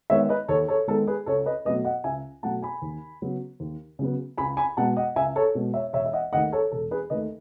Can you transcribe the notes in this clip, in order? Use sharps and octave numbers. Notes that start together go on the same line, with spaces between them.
D#3 G#3 B3 C#5 E5
B4 D#5
D#2 A4 C#5
A4 C#5
D#3 G#3 B3 A4
G#4 B4
C#2 A4 C#5
B4 D#5
B2 F#3 A3 B4 D#5
D#5 F#5
C#2 E5 G#5
B2 F#3 A3 F#5 A5
G#5 B5
D#2
C#3 F#3 B3
D#2
C#3 F#3 B3
C#2 G#5 B5
G#5 B5
B2 G#3 F#5 A5
D#5 F#5
C#2 E5 G#5
A4 C#5
B2 G#3
C#5 E5
E1 C#5 E5
E5
D#5 F#5
D#2 D#3 A3 D#5 F#5
A4 C#5
E1 A4
G#4 B4
D#2 D#3 A3 B4 D#5